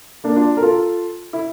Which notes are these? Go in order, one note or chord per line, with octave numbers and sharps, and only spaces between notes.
A#3 D4
D4 F4
A#4
F4 A4
E4